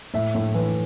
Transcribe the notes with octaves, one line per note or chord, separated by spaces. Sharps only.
A2 E5
A2
E3